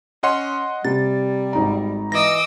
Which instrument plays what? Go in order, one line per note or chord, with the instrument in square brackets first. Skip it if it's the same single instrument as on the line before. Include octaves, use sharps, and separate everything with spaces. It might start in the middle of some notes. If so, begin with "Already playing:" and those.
[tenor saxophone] C#4 [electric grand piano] D#5 F#5 C6
[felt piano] C3 [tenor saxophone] G3 [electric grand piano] A6
[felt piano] G#1 D#4 A#5
[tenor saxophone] E3 [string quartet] D#5 D6 E6 [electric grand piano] A#6